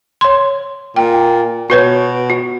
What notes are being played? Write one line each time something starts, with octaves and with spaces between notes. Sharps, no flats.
C#5 C6
A#2 G5
B2 F#4 B4 C#5
F#4